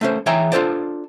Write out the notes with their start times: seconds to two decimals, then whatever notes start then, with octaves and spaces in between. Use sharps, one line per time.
0.01 A3 C#4 C5
0.26 E3 G#4 C#5 E5 G5 A#5
0.52 D4 F4 A4 C5 D5